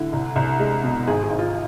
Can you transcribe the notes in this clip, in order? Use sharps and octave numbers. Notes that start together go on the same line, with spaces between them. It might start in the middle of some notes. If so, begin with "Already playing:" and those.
Already playing: D3 E4
C2
C2
G#3
B2
G#1 G#4
G#4
G#1
F4